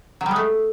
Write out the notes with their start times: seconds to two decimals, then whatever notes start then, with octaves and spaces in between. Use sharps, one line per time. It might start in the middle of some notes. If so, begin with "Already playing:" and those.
0.21 F#3
0.26 G3
0.31 G#3
0.36 A3